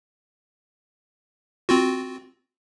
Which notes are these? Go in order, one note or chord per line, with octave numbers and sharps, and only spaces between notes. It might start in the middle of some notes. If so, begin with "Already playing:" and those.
C4 F4 F#4